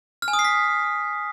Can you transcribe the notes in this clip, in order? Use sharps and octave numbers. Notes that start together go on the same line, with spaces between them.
F6
G#5
D#6
C7
B6